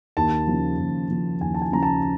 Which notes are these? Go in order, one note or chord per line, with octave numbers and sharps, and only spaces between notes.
D#2 A5
C#3 F3
D#2
C#3 F3
D#2 G#5
A5
G#5
C#3 F3 A#5
A5